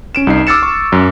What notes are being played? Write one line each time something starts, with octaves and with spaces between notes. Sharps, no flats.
C#4 D7 E7
C2 D#4 C7
D6 E6 F6 A6 C#7 E7
C#6
F#2